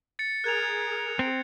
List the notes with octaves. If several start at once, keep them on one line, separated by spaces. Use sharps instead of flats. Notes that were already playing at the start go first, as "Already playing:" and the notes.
A6 C#7
G#4 A#4 F#6 G#6 F7
C4